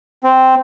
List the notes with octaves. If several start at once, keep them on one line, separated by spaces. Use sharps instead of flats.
C4